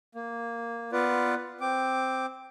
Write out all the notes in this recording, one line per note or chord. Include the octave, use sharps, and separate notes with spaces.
A#3
B3 F4 B4 D5
C4 D6